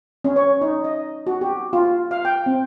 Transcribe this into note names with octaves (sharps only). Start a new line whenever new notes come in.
C#4
C#5
D#4
D#5
F#4
G4
F4
F5
G5
C4